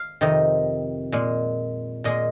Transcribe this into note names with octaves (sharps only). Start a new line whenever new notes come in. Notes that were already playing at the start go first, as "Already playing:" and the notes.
Already playing: F5
F2 C3 D#3 D#5
A#2 G#3
A#2 G#3 D#5